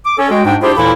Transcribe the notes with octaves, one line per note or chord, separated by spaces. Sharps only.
D6
C#4 A4 C#5
G#3 F#4 G5
G#2 D4 G5
D4 E4 F4 G4 G#4 C5
D#2 A#2 E3 E4 A4 B5